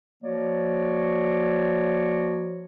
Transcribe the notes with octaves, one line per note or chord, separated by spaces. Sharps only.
F3 A#3 F#4 C#5 D5